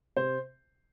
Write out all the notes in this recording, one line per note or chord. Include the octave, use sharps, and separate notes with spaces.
C3 C5